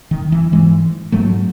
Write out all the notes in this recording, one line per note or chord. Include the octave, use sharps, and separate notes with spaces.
D#3
E3
G#2 E3 G#3
G#2 F#3 A3